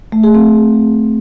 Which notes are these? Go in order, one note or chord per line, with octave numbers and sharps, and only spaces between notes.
A3
G#4
C4